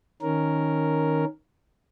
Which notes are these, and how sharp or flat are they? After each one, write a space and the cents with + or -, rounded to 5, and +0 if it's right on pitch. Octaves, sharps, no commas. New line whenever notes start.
D#3 +0 C#4 +0 A#4 +0